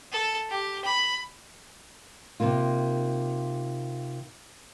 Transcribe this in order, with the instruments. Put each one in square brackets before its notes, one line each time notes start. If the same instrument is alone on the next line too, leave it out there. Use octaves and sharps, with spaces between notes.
[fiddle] A4
G4
B5
[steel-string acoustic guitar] C3 D#3 A#3 F4